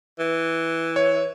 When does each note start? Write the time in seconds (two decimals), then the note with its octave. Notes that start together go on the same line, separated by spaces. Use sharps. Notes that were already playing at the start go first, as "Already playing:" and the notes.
0.19 E3
0.96 C#5